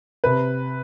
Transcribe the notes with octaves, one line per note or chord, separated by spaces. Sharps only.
C3 B4